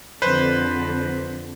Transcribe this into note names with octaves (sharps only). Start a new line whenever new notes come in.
F2 D3 B4 C5